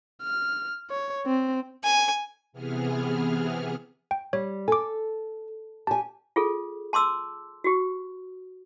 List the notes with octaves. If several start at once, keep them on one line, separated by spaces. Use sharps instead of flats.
F6
C#5
C4
G#5
C3 E3 B3 G#4 F6
G5
G3 C#5
A4 G#5 D6
G4 G#5 A5
F4 G#4 A4
A5 C6 D6 E6
F#4 G4